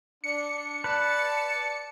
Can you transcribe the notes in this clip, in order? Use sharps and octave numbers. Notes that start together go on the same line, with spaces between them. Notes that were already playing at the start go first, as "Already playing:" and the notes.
D4 C#7
B4 D5 A5